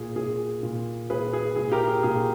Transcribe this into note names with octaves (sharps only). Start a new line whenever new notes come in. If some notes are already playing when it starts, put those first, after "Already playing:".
Already playing: A#2 G#4
A#2 G#4
A#2
A#2 G#4 B4
G#4
A#2 G#4
G4 A#4
G#4
A#2 G#4